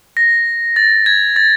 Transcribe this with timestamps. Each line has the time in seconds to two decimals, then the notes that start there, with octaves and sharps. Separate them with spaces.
0.17 A#6
0.76 A6
1.06 G#6
1.36 A6